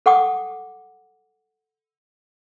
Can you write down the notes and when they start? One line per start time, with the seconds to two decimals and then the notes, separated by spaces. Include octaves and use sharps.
0.06 A4 F#5 G5 D6 D#6